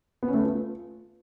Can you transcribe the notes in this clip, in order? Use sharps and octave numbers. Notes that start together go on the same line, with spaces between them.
B3
C#4
A3
B4
F4